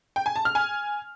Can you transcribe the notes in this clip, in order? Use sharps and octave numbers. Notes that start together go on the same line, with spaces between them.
G5
G#5
A5
F6
G#5